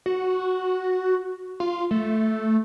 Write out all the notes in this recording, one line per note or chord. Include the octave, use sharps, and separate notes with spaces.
F#4
F4
A3